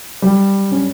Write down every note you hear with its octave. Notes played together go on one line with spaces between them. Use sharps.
G3
C#4